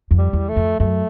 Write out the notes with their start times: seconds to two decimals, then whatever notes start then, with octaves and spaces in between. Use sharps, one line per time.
0.11 F2
0.18 G3
0.33 E2
0.49 A3
0.56 F2
0.80 F#2 A3